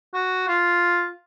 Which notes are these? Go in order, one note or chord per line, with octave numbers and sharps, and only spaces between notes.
F#4
F4